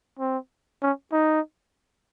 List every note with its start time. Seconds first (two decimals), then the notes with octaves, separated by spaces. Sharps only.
0.19 C4
0.82 C#4
1.12 D#4